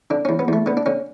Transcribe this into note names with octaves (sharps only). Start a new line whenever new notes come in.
D3 D4
E2 C#4
B3
E2 A3
D3 B3
D4
D3 C#4